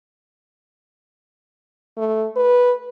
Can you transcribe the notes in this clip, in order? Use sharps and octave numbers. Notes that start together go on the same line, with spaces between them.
A3
B4